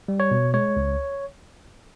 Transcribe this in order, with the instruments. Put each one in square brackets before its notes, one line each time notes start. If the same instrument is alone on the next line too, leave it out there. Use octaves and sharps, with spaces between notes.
[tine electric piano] G3
C#5
B2
G#3 C#5
C#2